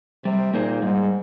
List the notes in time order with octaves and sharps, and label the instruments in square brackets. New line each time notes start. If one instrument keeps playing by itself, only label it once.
[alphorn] C3 [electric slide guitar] G3
[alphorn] A#2 [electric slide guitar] A#3 D#4 G#4 C5
[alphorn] G#2 [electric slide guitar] G3